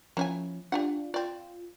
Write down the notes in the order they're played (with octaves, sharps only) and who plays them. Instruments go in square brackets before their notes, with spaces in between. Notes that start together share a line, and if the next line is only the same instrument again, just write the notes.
[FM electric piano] F3 C#4 [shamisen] A#3 E4 G#5
[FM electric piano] D4 F4 [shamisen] G4 D5 F#5
[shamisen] C4 D5 [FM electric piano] F4